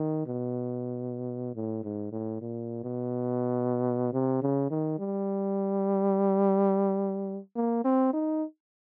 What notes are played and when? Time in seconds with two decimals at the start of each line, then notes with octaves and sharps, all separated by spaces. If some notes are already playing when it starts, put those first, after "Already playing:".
Already playing: D#3
0.26 B2
1.55 A2
1.84 G#2
2.12 A2
2.41 A#2
2.84 B2
4.13 C3
4.42 C#3
4.70 D#3
4.99 G3
7.56 A#3
7.84 C4
8.13 D#4